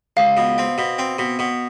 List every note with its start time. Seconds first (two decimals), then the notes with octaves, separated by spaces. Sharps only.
0.17 C#2 F5
0.37 B2
0.58 C4
0.78 B2
0.98 C4
1.19 B2
1.39 B2